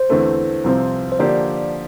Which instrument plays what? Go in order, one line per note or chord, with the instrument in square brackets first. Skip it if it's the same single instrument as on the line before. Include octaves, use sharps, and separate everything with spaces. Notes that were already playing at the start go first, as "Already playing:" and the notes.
Already playing: [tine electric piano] C5
[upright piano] E2 D3 A3 C4
C2 C3 F3 C4
[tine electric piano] C5
[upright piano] D3 F3 A#3 D4 G4 [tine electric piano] D5